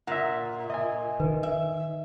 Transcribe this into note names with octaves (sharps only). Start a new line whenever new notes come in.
A#2 E5 F#5
D#5 E5 G#5
D#3 B4
E5